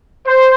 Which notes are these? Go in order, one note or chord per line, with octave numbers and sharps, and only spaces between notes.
C5